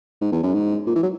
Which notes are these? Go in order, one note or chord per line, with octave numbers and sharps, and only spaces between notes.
G#2
E2
F#2
G#2
A#2
E3
F#3